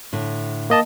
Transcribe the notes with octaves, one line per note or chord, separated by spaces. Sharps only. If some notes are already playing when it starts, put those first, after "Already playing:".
A2 D3
A#3 D#5 A5